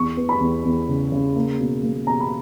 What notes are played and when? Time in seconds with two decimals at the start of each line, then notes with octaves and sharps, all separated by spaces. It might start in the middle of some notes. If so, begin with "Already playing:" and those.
Already playing: E2 C#6
0.17 B3
0.29 B5
0.40 E2
0.65 E2
0.88 C#3
1.12 C#3
1.36 A#3
1.59 B2
1.83 A#3
2.07 B2 A#5
2.20 B5